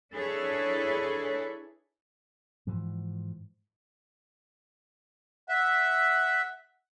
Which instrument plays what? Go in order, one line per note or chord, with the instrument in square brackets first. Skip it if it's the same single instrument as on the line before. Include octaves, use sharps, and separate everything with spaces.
[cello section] D4 E4 G#4 A4 B4 C#5
[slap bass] G#2 E3 F3
[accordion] E5 [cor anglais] F#5